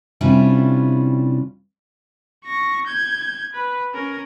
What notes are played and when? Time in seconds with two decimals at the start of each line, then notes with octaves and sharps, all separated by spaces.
0.21 C3 G3 C#4 D4 E4 F4
2.45 C#6 A#6
2.87 G6 G#6
3.53 B4
3.94 C#4 A#4